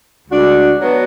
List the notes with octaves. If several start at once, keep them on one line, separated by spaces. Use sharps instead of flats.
D2 D3 G#3 D4 F#4
F#3 B3 D4 F#4 B4